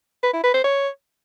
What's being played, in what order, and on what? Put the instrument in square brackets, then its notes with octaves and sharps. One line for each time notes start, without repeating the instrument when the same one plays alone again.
[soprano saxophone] B4
E4
B4
C5
C#5